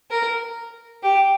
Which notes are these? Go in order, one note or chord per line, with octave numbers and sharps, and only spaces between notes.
A#4
G4